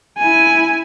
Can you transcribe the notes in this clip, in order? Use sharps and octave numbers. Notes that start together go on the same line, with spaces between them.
E4 G#5